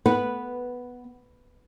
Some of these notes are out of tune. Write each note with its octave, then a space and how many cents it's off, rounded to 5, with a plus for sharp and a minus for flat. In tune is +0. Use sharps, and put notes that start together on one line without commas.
B3 +0 B4 -5